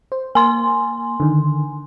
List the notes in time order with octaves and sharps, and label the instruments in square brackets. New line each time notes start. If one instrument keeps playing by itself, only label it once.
[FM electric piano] C5
[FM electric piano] A#3 [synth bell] G#5 C6
[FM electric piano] D3 D#3